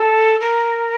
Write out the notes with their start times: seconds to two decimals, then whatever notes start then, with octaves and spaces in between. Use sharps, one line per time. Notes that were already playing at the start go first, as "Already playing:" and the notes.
Already playing: A4
0.41 A#4